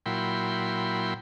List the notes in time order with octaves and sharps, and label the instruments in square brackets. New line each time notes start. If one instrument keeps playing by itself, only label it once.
[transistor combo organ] A#2 F#3 E4 G5 B5 C6